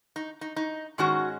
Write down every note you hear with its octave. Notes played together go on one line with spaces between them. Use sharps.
D#4
D#4
D#4
G#2 D#3 G#3 C#4 F#4